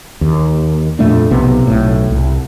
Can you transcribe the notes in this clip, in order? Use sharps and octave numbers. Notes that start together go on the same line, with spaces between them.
D#2
F2 A#2 A3 D4
B1 C3 B3
B1 A2
C2